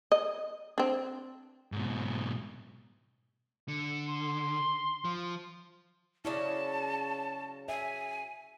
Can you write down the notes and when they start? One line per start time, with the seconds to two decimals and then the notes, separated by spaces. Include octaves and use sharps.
0.12 D#5
0.78 C4 D4
1.72 G#2 B2
3.68 D3 C#7
4.08 C6
5.05 F3
6.25 C#3 F#3 C#4 E4 D5 A5
7.68 E5 G#5